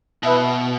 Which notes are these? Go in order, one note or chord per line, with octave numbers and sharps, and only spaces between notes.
B2 E4 B4 E5